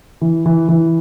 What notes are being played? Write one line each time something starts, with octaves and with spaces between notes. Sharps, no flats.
E3
E3
E3